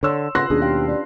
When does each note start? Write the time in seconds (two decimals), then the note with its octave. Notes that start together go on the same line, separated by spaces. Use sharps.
0.03 D3 C#5 C6 E6
0.35 C#3 B3 F4 B4 C6 F#6 A#6
0.50 D#2 B2 C#4 D4 G#4
0.62 G4 F5
0.88 G3